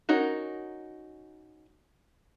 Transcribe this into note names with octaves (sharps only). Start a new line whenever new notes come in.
C#4 D#4 F#4 A#4